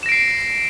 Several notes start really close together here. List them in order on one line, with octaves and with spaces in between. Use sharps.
E7 A#6 D7 C7